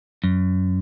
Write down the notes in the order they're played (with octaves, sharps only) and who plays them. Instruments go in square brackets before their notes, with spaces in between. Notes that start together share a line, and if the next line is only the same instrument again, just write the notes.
[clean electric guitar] F#2